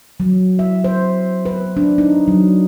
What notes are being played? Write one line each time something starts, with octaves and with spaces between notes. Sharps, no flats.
F#3
E5
C5
B4
D4
D#4
F#3